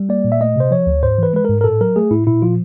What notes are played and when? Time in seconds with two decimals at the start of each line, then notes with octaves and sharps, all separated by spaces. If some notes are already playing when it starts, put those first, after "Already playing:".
Already playing: G3
0.09 A#3 D5
0.25 A#2
0.32 E5
0.41 A3 D#5
0.56 C3 C5
0.71 F3 C#5
0.87 D2
1.03 G#2 C5
1.18 E3 B4
1.33 G#3 B4
1.45 G#2 A#4
1.61 A#4
1.64 A2 A4
1.81 F#3 A#4
1.96 A3 G#4
2.11 A2 E4
2.27 A#2 E4
2.42 F3 F4